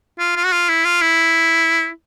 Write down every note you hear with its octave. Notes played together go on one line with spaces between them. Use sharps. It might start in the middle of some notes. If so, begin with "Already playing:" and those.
F4
F4
F#4
F4
E4
F4
E4